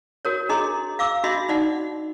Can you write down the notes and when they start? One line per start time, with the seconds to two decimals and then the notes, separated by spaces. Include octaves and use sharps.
0.25 F#4 A#4 C#5
0.49 D4 G#4 D#5 A#5 C6
0.99 F5 D6 E6
1.24 D4 F#4 D#5 E5 B5 C6
1.49 D#4 D5 F#5